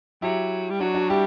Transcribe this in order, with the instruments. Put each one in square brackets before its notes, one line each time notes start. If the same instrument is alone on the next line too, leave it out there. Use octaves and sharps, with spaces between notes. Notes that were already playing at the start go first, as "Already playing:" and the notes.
[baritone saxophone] F#3 [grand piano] E4 G4
[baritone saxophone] G3
[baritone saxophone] F#3 [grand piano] D4 F#4
[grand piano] D4 F#4
[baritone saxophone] G3 [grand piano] E4 G4